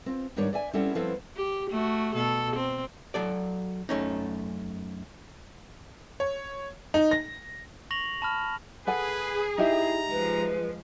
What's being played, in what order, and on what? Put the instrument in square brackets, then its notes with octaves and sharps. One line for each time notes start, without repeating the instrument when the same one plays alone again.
[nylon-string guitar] C4 F4
G#2 D#3 G3 D4 C#5 D5
D5 E5 G#5
G3 C4 C#4 E4 A4 F#5
F3 B3 C4 E4 A4 F5
[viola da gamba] G4
A3 F#4
B2 A4
C4
[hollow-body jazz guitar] F#3 A4 D5
F#2 A3 C#4 D#4
[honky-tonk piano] C#5
D#4
A#6
[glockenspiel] C#6 A#6 F7 F#7
A5 B5 F6
[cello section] G#4 [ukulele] A4 F#5 G#5 [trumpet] B4
[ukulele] D#4 G4 E5 [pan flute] E4 [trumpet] A#5
[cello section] F3 G#3 [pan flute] B4